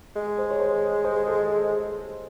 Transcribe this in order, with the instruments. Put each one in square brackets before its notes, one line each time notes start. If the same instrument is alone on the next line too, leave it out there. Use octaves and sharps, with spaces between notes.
[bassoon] G#3
[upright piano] C5
C#5
C5
C5
A4